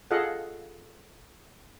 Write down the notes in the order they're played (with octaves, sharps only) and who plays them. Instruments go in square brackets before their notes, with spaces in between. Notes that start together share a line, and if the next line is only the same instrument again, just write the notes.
[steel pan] F4 G#4 A4 D#5 F5 F#5